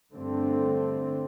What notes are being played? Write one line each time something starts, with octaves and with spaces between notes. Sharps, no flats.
G2 D3 A3 C4